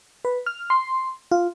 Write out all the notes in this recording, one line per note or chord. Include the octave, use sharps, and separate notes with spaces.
B4
F6
C6
F4